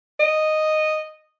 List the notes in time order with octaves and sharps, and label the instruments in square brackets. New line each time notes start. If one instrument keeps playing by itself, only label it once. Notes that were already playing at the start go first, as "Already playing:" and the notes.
[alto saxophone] D#5